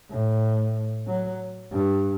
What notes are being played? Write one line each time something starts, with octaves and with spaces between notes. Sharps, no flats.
A2
F#3
G2